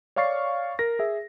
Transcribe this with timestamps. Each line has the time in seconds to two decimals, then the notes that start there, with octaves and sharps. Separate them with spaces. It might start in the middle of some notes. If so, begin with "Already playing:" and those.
0.16 C#5 D5 F5 C#6 A6 C7
0.79 A#4 A#6
0.99 G#4 E5